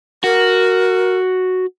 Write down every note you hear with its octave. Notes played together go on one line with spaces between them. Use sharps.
F#4 A#4